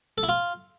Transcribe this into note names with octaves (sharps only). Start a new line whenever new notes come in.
A4
E4
F4